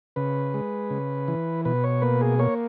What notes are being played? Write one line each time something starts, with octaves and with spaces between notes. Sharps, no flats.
C#3 B4
G#3
C#3
E3
B2 B4
C#5
A#3 B4
G#4
A#3 C#5